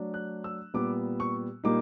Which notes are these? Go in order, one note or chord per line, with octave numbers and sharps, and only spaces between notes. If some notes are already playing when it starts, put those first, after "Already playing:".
Already playing: F#3 A3 D4
F#6
E6
A#2 G3 B3 D6
C#6
A#2 G3 A#3 D#4 D6